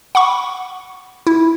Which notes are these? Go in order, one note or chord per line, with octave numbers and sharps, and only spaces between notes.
F#5 B5 C#6
E4